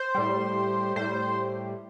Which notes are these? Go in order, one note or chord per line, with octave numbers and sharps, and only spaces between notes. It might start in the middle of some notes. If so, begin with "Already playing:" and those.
Already playing: C5
A2 G3
A2 G3 C5